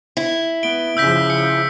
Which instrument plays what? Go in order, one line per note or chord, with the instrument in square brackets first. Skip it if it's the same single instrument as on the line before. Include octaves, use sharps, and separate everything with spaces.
[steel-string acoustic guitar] E4
[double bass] B3 [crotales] D7 G7
[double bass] C#3 F3 [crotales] E6 G6 B6
[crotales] C#7